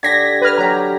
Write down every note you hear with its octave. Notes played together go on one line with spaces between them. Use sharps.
D3 G4 D5 G#6 A#6 B6
B4 F6
F#3 G4 A#5